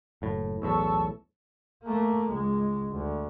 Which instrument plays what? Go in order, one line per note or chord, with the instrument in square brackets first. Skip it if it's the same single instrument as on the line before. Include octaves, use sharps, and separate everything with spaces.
[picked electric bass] F#1 A2
[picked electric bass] B1 E2 A2 [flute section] A5 C#6 E6
[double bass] A3 A#3
C#2 G#3
D2